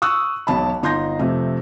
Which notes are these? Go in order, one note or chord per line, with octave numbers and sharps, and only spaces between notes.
C#6 D#6 E6 F#6
E1 B1 A5 B5
G1 D#4 C6 G6 A#6
F2 C3 A3